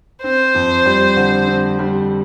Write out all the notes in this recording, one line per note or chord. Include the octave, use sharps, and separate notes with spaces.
C4 C5
F2
G3
D3
C4
G3